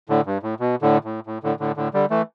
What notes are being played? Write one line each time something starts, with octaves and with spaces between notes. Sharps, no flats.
A2 D3
G2
A2
B2
A2 D3
A2
A2
A2 D3
A2 D3
A2 D3
D3 G3
E3 A3